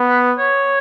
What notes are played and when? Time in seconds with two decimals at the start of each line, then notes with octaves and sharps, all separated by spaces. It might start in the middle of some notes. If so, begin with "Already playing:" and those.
Already playing: B3
0.09 B4
0.38 C#5